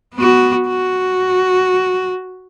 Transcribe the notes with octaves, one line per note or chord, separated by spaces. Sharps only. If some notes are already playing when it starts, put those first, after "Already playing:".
B3 F#4
F#4